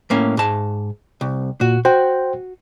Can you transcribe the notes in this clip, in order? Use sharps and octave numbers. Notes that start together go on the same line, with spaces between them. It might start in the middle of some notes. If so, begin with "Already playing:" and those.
A2 A#3 C#4
G#2 A5
C2
A#2 F#4
F#4 C5 G5